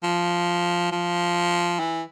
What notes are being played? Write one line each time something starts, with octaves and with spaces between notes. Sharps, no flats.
F3
F3
E3